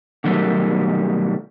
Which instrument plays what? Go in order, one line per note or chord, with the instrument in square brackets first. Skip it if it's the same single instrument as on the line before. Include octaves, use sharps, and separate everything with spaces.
[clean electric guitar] B2 D3 D#3 F#3 G3 A3